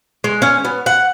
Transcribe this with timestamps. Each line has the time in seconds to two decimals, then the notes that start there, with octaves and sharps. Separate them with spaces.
0.24 G#3
0.42 C#4
0.65 B3
0.86 F#5